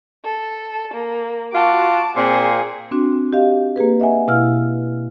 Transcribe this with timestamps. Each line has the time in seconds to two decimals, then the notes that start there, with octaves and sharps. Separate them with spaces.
0.25 A4
0.94 A#3
1.53 F4 F#4 A5 D6
2.17 A#2 C4 G#4
2.91 C4 D4 F#4
3.33 G4 D#5 F5
3.76 A#3 G4 G#4 B4
4.00 D#5 E5 F#5 G#5
4.28 B2 E4 F5 E6 F6